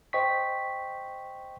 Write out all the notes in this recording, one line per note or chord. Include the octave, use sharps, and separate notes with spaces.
C5 D#5 G5 C#6 B6